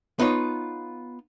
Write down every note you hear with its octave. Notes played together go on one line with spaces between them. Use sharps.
B3 D#4 F4 C#5